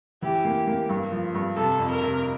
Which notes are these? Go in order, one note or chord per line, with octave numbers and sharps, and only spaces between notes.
E3 G4
A#3
A#3
G2
F3
G2
C3 A4
F2
A#4
C3